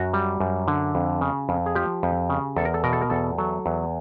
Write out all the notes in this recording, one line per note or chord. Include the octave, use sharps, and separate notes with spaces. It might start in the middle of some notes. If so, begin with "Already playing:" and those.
Already playing: F#2 F#4
G3
F#2
D3
F2
C#3
F2
G#4
F3 G4
F2
C#3
E2 A4
A#4
A4
B2 A#4
A4
A#4
E2 A4
F#3 A4
E2